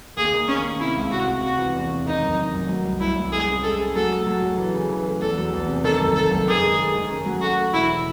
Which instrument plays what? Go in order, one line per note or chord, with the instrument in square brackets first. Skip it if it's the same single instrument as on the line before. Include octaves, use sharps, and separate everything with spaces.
[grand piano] D#2 [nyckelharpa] G#4
[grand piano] D#3
[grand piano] D#2 [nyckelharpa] C#4
[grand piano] D#2
[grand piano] C3 [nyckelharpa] E4
[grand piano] C#2
[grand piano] C3 [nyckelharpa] F#4
[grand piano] C#2
[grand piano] C3 [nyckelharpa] F#4
[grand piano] E3
E2
C3
[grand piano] D#3 [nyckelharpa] D#4
[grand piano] F#2
D#3
F#2
F#3
C2
[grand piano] C2 [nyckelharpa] E4
[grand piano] C2
[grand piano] G#3 [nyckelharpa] G#4
[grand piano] C#4
[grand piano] G#3 [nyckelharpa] A4
[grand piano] G#4
[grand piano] F#3 [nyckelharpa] A4
[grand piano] A3
F#3
F#3
E3
C#3
E3
A3
[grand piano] E2 [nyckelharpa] A4
[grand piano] F#3
E2
C3
[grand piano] D#3 [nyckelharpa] A4
[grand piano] F#2
[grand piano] F#2 [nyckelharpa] A4
[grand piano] F#1
[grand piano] D#3 [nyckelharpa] G#4
[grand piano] G#3
G#3
D#3
C#4
F#3
[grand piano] A3 [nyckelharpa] F#4
[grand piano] A3
[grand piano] E1 [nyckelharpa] E4